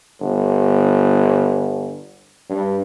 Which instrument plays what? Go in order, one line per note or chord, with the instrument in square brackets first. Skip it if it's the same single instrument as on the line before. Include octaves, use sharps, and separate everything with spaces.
[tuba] G1
G2